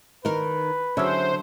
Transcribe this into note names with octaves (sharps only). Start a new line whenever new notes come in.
D#3 D#4 A#4 B4
D3 F#3 C#4 G#4 C5 E5